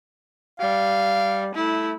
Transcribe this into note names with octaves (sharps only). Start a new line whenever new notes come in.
G3 F5
A3 E4